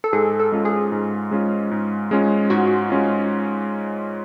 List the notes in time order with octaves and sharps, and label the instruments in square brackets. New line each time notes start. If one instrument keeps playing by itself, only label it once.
[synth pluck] A4
[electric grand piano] G#2 [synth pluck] G#4
[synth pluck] A4
[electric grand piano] G#3 C#4 F4
[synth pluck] G#4
[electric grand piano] G#2
G#3 C#4 F4
G#2
G#3 C#4 F4
[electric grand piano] G#2 [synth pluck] F#4
[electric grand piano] G#3 C#4 F4